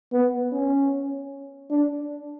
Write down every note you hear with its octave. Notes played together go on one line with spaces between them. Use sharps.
B3
C#4
D4